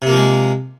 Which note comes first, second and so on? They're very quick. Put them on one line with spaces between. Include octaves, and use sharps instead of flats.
C3 A#3 F3 G#3